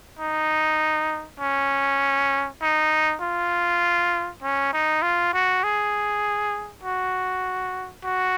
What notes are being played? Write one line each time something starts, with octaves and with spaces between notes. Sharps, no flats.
D#4
C#4
D#4
F4
C#4
D#4
F4
F#4
G#4
F#4
F#4